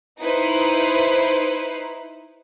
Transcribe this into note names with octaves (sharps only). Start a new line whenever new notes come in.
D#4 E4 B4 C5